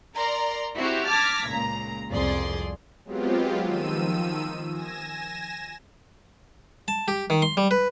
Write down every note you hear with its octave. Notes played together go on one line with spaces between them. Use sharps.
A#4 D5 A#5 C6
C4 E4 F#4 G4
A5 D6 F6 G#6 A#6 B6
C#2 A#2 A#5
C2 F2 G#4 D5 C6
F#3 G#3 B3 C4 F4 G4
D#3 F3 E6 D#7
G#5 A#6 E7
A5
G4
D#3
C6
G3
B4